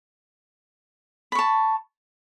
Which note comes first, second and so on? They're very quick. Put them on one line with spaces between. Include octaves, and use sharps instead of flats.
B5 C#6 A5